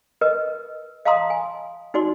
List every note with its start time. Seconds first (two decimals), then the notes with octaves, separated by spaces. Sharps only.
0.21 A#4 B4 D#5
1.05 D#5 F5 A5 A#5 C6 D#6
1.30 G#5
1.94 D#4 F#4 D5 C6